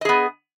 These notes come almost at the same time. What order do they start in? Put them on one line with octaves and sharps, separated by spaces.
D#5 G#4 B3